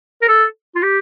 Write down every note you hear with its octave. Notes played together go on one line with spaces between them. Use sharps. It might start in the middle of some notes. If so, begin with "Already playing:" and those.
A#4
A4
F4
G4